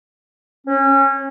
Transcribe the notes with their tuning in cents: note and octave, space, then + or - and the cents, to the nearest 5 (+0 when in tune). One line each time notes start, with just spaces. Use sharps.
C#4 -25